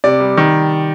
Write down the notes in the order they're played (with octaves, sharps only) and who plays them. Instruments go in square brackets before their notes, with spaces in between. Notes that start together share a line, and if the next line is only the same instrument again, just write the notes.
[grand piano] C3 D5
G3
D#3